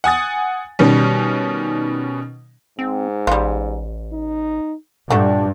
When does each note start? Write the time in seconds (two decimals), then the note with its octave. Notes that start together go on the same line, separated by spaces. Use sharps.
0.04 F#5 G#5 D#6 A6
0.79 B2 D#3 G3 C#4
2.79 G#2 C4
3.27 A1 G3 F4
4.13 D#4
5.10 G2 A#2 A3 D4 F#4